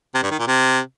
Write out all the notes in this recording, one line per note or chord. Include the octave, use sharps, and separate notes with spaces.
C3
G2
D#3
A#2
C3